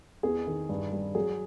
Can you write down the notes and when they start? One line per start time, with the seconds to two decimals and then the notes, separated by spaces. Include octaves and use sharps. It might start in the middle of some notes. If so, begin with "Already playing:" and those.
0.23 E2 G#4
0.47 D#3
0.69 G2
0.92 G3
1.15 F#3 G#4